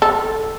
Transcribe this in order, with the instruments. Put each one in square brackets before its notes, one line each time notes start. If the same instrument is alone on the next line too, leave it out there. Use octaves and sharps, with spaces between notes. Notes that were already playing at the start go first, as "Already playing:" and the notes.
[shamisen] A4